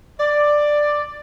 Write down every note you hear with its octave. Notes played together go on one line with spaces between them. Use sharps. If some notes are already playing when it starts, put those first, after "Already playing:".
D5